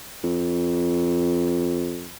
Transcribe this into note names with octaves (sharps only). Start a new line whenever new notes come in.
F2